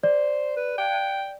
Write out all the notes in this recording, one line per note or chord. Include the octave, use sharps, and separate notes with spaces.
C5 D5
B4
G5